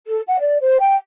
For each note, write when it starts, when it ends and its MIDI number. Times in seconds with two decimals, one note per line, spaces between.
0.07 0.21 69
0.28 0.37 78
0.40 0.57 74
0.61 0.77 72
0.80 0.95 79